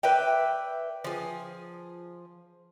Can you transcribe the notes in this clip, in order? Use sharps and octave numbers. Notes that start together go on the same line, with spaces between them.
B4 D5 E5 G5
F3 G#4